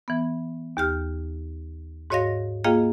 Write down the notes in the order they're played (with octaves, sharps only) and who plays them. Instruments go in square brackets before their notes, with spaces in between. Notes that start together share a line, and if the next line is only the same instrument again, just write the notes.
[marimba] E3 B3
D#2 G4 F6
G#2 F#4 C#5 D#5 F5 A#6
A#3 F4 G#4 D#5 F5 G5